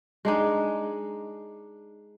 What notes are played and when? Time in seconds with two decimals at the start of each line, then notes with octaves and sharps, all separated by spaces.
0.25 G#3 D4 D#4